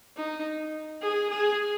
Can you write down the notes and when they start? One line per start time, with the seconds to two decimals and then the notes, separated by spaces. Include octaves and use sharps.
0.16 D#4
1.02 G#4
1.30 G#4